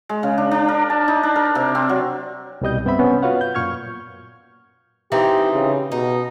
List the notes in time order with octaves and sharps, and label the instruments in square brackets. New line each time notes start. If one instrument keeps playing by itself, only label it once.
[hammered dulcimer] G#3
C#3
D4
D4
A#4
A5
D#4
D4
A#4
C3
C4
F#3
[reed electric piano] C2 B2 G3 D#5 G6
G2 B3 C4 E5 B5
C3 B3 C#4
F4 F#4 B4 C#5 F5 F#5
G6
F#2 A#2 C#6 F6 G#6
[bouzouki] E3 C4 D#4 [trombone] G4
[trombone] C#3
[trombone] B2 [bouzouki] D#4